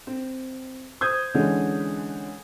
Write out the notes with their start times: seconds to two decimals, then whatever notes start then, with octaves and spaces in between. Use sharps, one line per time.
0.07 C4
1.01 C5 D#6 G6 G#6
1.34 D3 E3 G#3 C#4